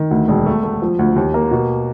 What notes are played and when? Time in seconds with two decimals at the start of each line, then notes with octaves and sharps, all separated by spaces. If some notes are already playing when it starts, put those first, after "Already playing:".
Already playing: D#3
0.11 D2
0.28 E1
0.46 A3
0.64 A3
0.82 F3
0.99 D2
1.16 D#2
1.34 A#3
1.51 B2